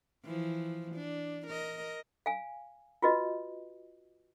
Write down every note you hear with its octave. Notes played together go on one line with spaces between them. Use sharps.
E3 F3
D4
A#4 D#5
F5 G#5
F4 F#4 B4 D#5